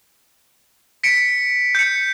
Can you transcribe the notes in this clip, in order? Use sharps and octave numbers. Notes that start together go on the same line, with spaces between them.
B6 C#7 D7
G6 C#7